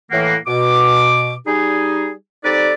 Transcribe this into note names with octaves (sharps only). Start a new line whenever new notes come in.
A2 E3 A#3 F#5
B2 D6
G3 D#4 G#4
G3 C4 D#4 A4 B4 D5